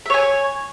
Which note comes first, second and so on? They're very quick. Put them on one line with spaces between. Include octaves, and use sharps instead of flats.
E5 C#5 G#5